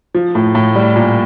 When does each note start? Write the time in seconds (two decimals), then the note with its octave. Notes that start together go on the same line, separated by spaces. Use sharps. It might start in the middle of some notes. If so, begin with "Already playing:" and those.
0.15 F3
0.35 A2
0.55 A2
0.76 G3
0.96 A#2